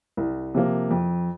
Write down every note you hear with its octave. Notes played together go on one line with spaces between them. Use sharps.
C2
C3 F3 A#3
F2